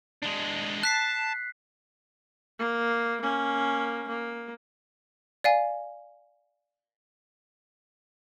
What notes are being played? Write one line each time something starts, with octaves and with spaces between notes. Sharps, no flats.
G#3 D4
A5 F#6 B6 C7
A#3
A#3 C#4
A#3
D5 F5 G#5